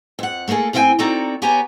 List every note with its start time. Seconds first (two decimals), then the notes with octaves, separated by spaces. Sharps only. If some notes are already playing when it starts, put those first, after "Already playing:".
0.19 F2 F#5
0.48 A3 A#3 D#4 G#4 A4
0.73 A2 B3 C4 E5 G5 G#5
0.99 C4 D#4 F#4 A4 D5 A#5
1.42 B3 G4 C#5 G#5 A#5